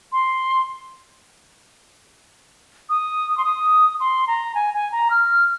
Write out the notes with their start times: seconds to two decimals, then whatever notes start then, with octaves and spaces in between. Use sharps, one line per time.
0.12 C6
2.89 D#6
3.38 C6
3.44 D#6
4.00 C6
4.28 A#5
4.55 G#5
4.74 G#5
4.92 A#5
5.10 F6